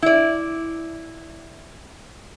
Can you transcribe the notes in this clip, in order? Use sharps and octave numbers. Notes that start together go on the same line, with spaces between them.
E4 D5